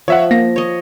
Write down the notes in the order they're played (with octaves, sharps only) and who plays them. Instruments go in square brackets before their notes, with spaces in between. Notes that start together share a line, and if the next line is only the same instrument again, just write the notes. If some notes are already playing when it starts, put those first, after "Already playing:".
[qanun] F3 [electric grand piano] C#5 E5 F#5
[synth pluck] A#3 [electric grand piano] A#6
[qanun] C#5 D#5